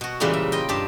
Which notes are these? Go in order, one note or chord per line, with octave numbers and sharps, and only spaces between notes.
B2 F#4
A#2 C#3 E3 G3 G#3 A#3
E5
F4 D#5 G5
G2 G4 A5